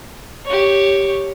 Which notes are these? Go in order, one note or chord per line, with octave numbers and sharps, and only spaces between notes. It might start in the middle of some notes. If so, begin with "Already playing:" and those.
G4 C#5